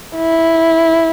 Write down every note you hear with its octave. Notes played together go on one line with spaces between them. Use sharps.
E4